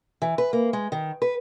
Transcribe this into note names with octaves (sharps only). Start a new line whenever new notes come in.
E3
B4
A#3
G#3
D#3
B4